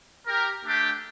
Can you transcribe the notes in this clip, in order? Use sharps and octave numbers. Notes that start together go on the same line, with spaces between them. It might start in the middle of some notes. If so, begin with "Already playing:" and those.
G4 A#4
A3 D4 G4